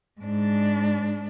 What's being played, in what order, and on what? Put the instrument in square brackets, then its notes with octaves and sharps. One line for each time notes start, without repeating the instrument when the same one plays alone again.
[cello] G#2 D4